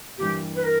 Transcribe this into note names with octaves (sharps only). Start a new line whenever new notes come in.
G2 E3 A#3 G4
B4
A#4